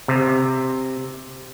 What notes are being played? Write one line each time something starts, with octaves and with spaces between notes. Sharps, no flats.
C3